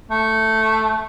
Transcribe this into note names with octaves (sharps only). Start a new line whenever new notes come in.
A3